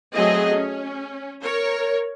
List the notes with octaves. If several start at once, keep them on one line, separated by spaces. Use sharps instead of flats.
F#3 A3 C4 G#4 D#5
C#4
A#4 C#5